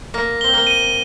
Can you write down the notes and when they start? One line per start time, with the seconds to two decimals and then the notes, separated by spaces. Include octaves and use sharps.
0.14 A#3 A#6
0.41 C4 G7
0.53 A#3
0.67 D#7